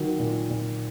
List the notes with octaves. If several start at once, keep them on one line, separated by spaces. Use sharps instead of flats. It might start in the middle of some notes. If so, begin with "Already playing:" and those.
Already playing: D#3 F#3
A#2
A#2